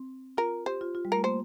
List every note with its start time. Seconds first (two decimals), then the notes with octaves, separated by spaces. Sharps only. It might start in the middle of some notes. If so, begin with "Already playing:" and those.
Already playing: C4
0.38 F4 A#4
0.66 G4 C5
0.81 F4
0.95 F4
1.05 G3
1.12 A3 A#4
1.24 A#3 C5